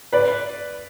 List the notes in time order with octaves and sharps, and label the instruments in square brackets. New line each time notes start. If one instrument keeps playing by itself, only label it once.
[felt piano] B4 D5